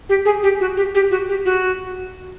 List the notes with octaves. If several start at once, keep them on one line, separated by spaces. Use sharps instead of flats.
G4
G#4
G4
F#4
G4
G4
F#4
G4
F#4